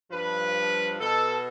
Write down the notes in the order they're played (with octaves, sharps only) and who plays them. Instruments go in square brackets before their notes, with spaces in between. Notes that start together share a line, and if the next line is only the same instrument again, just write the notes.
[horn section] G2 F3 B4
B2 A4